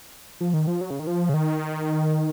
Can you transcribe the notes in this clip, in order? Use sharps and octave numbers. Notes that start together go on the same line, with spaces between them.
F3
D#3
F3
F#3
C#3
D#3
F3
C#3
D#3